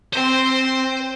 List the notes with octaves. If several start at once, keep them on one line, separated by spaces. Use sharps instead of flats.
C4 C5 C6